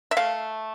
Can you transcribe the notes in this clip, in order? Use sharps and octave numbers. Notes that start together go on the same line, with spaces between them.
E5
A3 F5